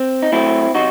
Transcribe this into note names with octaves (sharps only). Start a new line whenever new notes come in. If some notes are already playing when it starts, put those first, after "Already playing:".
Already playing: C4
D#4
A2 F#3 A3 C4 E4
C3 F#3 D#4 F#4